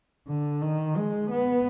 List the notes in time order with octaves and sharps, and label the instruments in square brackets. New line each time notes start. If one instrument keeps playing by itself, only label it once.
[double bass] D3
D#3
G#3
B3